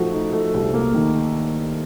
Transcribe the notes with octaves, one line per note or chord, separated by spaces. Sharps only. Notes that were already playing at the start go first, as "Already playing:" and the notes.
Already playing: F3 A3 D#4 F#4
D#4
A3
C2
A#3
D#3